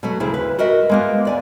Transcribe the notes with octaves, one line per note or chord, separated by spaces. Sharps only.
B2 F#3 A3
D2 C#3 E4 G#4
B4
F#4 A#4 D#5 E5
G#3 A#3 B3
D2 D5 G#5